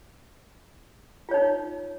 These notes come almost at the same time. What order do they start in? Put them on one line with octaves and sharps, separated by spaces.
F4 C#5 D#4